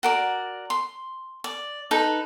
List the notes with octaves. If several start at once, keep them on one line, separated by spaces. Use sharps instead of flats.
F#4 A#4 D5
C6
D5
D#4 A4 B4